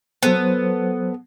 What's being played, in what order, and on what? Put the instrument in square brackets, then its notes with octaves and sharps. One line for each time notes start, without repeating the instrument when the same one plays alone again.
[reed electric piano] F#3 C5 [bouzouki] B3 A4